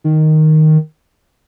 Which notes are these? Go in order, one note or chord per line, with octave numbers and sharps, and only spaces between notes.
D#3